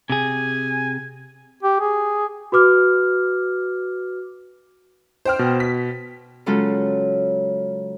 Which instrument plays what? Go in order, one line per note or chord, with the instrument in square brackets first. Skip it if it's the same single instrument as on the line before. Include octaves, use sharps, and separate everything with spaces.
[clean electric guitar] C3 G#4 [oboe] G#5
[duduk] G4
G#4
[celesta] F#4 B4 D6 F6
[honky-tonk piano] C5 G5 F6
[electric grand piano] B2
[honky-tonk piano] B6
[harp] C#3 F#3 G#3 C#4 F4 A4